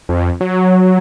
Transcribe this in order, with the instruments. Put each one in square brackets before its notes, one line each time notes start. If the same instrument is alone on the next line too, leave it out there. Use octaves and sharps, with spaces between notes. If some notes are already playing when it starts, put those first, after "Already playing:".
[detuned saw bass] F2
F#3